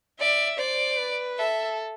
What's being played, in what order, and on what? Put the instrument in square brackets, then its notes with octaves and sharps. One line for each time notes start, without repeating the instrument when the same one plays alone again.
[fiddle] D5 [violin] E5
[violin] C5 [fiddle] D5
[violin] B4
[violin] A4 [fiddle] E5